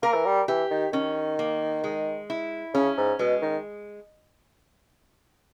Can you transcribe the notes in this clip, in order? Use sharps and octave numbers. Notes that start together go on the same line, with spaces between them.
A#3 A#4
E3
G3
E3 G4
D#3
D#3 C#4
A#3
G#3
E4
C#3 C#4
G#2
B2 G#3
D#3